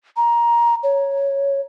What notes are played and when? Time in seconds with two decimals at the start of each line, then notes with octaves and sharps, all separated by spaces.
0.17 A#5
0.83 C#5